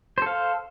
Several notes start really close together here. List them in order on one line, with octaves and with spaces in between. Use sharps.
C5 A4 F5